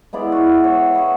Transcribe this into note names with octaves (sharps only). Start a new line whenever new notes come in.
G#3 B3 E4 D5
F#4
C#5
B3 F#4